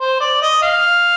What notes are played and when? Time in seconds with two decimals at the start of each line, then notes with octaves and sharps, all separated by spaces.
0.01 C5
0.20 D5
0.42 D#5
0.62 F5